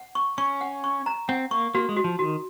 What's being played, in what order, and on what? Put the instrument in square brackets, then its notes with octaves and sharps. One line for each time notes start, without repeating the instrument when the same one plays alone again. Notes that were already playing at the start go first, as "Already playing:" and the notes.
Already playing: [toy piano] F#5
C#6
[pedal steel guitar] C#4 [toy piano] C#6
[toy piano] F#5
C#6
A#5
[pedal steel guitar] C4 [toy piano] F#5
[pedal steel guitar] A#3 [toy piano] C#6
[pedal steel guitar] A#3 [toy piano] F#4
[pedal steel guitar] G#3
[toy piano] F#4
[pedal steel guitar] F3
[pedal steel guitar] D#3 [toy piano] F#4